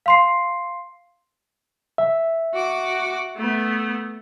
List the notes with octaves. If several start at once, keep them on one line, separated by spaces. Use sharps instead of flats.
F5 C6 C7
E5
F#4 D6
A3 B3